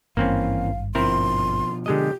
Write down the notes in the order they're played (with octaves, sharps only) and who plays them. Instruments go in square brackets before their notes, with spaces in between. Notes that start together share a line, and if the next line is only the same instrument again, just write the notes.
[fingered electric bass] G#1 G2 [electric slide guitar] E3 [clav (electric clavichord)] A#3 C4 C#4 [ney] F5
[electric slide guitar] B2 F3 [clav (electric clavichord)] C4 E4 A#4 [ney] C6
[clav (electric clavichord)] D3 G#3 D#5 [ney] G4